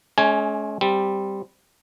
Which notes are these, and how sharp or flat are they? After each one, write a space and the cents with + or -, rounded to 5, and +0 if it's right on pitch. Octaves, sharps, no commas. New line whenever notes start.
G#3 +45 C#4 +20 G#5 +0
G3 +0 C4 +0